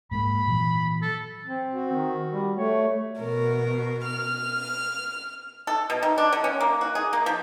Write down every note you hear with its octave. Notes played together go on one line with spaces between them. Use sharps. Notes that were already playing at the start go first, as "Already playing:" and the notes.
G#2 G#3 A#3 B5
A#2 E3 F#3
A4
C4
F#4
D#3
G3
A3 C#5
B2 A#4
F6
A4
B2
D#3
D4
D3
C#4
A#3
F#4
G#4
A#3
F3